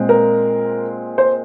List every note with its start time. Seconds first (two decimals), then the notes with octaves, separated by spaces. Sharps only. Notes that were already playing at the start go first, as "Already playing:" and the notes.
Already playing: A#2 G#3 C4
0.09 A#4
1.18 C5